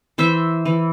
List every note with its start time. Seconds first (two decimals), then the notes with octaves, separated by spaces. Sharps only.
0.18 E3 C5 E5
0.65 E3